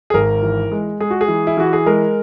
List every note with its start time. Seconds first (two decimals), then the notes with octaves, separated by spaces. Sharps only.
0.10 G#4
0.14 G#1 A#4
0.42 E3
0.72 G#3
1.00 G#3 G#4
1.10 F#4
1.21 G#4
1.28 E3
1.47 E4
1.57 E3 F#4
1.73 G#4
1.86 G#3 A#4